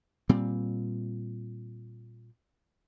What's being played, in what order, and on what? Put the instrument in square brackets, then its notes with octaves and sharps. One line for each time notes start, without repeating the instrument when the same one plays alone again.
[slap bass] A#2 G3 C4